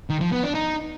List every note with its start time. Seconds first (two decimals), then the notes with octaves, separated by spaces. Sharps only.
0.10 D#3
0.21 F3
0.32 B3
0.43 D4
0.54 D#4